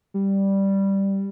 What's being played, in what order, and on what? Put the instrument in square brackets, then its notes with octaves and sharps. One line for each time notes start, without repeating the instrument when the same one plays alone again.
[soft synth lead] G3